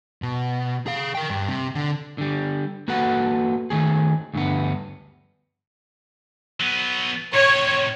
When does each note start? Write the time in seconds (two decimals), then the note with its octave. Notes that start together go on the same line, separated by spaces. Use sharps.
0.22 B2
0.87 G#4 F5
1.15 A#4 G5
1.30 G2
1.49 C3
1.75 D3
2.18 D3 G3
2.88 A#3 F#4 A4 B4 F#5
3.70 D#3 A3 G#4
4.34 D2 G2 D3 B3
6.61 F#3 B3
7.34 A2 C3 C#5